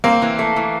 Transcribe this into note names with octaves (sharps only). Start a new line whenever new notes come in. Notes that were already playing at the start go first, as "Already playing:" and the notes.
A#3 C4
E3
A3
E3